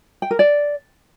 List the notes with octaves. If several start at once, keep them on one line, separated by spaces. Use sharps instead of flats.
G5
A#4
D5